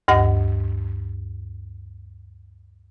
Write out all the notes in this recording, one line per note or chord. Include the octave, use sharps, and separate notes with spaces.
D2 G2 D#5 F#5